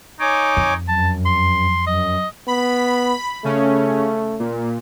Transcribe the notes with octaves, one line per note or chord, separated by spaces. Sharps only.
D#4 C#5 G#5 D6
F2
F#2 A5
C6
F#2 D#5
B3 B5
C#3 A3 C#4
A#2